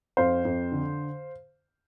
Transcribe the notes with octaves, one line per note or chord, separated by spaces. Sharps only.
F2 C5 F5
F2
D3